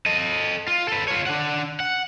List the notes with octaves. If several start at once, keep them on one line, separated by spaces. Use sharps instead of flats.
A4 D#5
F4
A4 B4
F4 C#5
D4 F#5
F#5